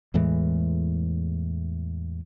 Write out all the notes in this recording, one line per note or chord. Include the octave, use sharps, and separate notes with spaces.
E2 A2 E3 G#3